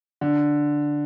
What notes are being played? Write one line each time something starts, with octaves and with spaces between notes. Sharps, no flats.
D3